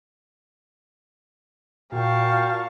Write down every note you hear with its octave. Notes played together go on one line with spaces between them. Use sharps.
A#2 F#4 F5 G5 A5 C#6